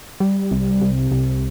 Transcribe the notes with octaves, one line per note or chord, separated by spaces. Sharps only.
G3
C2
C3
C2